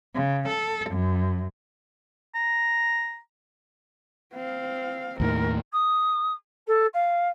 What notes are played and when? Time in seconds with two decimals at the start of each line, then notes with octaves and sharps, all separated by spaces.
0.15 C#3
0.48 A4
0.90 F#2
2.35 A#5
4.34 C4 F5
5.20 D#2 A2 D#3 A#4
5.72 D#6
6.67 A4
6.93 F5